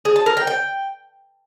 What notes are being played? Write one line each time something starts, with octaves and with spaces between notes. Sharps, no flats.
G#4
A5
A#4
G5
G5